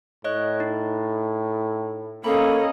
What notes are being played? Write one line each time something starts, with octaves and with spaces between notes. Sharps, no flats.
A2 C#5 D#5 F#6
D#4
A#3 C#4 A4 D#5 F5 A#5 B5